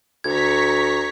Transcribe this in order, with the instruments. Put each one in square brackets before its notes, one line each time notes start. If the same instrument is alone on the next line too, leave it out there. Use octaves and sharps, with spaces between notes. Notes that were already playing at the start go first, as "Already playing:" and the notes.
[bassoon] D2 [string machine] A#5 C#6 B6 [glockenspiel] G#6